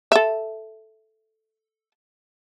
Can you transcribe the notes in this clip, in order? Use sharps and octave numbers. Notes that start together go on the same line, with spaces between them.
A4 E5